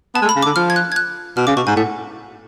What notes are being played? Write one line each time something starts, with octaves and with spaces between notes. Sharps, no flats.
B3 A5
G#3
A3
B5
C#3
D3 D6
F3 F6
G#6
F#6
G#6
F#6
B2 F6
C#3 D6
B2 C#6
G#2 G#5
A2 F#5